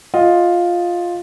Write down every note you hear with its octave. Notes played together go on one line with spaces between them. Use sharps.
F4 D#5